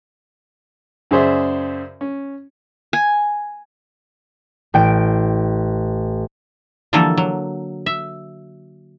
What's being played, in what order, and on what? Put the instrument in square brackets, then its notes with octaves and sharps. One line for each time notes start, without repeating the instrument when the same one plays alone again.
[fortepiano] F#2 C#3 G#4 C5 D5 E5
C#4
[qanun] G#5
[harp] A1 G5 D7
[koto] D3 E3 F3 G3 A#3 A4
F#3
E5